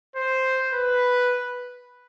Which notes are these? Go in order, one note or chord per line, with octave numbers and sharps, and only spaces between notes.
C5
B4